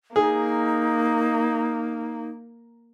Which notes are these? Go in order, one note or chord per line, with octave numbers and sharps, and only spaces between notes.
A#3 D#4 G#4